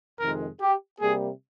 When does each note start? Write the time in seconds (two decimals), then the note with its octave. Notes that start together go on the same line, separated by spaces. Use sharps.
0.20 F2 C3 D#3 G#3 A#4
0.61 G4
1.01 C3 G3 A#3 G#4